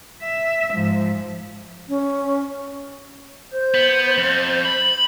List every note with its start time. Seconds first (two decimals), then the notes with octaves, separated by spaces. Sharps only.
0.23 E5
0.74 G#2 F3
1.89 C#4
3.53 C5 G6
3.74 B3
4.18 F2
4.65 B5